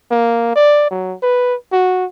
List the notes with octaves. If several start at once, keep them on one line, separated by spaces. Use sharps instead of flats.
A#3
D5
F#3
B4
F#4